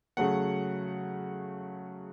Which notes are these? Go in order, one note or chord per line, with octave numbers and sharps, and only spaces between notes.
C#3 F#3 A3 F#5